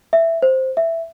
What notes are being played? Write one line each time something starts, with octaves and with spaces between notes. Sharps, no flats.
E5
C5
E5